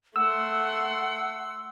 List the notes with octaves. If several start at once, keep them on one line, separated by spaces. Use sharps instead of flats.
A3 F#5 C6 E6